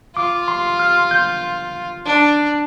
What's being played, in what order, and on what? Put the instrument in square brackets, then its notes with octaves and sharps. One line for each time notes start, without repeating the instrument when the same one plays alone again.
[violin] F4 [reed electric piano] D6
[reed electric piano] C6
F6
G6
[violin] D4